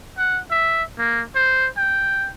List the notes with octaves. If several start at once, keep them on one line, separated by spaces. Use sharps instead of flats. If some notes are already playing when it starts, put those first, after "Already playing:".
F#5
E5
A#3
C5
G5